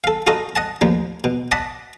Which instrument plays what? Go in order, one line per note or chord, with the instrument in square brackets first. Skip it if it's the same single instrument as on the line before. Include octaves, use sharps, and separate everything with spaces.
[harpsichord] A4 F5
D#4 F4 F#4 A4 D#5
D#5 F#5 A5
A1 D#2 F3
B2
D5 D#5 F#5 A5 B5